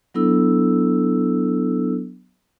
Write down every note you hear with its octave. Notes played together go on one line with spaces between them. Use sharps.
F#3 B3 D4 E4 A4 E6